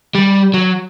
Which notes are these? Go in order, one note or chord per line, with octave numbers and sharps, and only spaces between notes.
G3
F#3